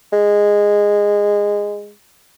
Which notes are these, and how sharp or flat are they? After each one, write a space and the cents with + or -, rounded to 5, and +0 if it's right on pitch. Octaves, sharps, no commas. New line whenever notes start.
G#3 -15